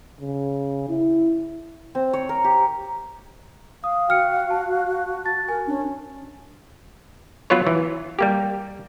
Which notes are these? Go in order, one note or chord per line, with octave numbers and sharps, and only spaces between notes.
C#3
E4
C4
C#5
A#4
G4
F5 D#6
F#4 G5 F6 C#7
A5
A5 A6
A#4 G#5
C#4 D4
F#3 B3 F4 B4 C#5
E3
G3 A#3 G4